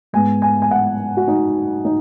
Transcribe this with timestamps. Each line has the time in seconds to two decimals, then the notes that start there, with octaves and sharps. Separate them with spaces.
0.13 G#2 G#3 B3 G#5
0.42 G#5
0.62 G#5
0.71 F#5
1.17 F#4
1.28 D#4
1.85 D#4